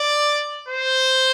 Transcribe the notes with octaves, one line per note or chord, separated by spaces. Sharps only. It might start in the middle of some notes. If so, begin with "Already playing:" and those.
Already playing: D5
C5